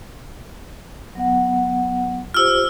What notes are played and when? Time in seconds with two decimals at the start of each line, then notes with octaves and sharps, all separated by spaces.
1.15 F#3 B3 F#5
2.34 F4 G4 C5 E6 F6